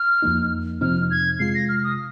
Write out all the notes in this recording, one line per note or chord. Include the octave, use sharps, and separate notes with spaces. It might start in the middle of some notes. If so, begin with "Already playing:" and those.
Already playing: F6
F2 F3 A#3 D#4
F2 C3 F3 C4 D#4 F6
G#6
C3 G#3 F4 C7
A#6
F6
D#6